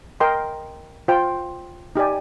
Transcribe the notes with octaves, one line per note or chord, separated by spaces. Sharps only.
A#4 D#5 G5 C6
F4 C5 G5
D#4 G4 D5 G#5